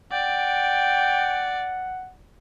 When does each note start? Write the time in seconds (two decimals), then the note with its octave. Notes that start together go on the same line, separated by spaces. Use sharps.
0.12 D5 F#5 G5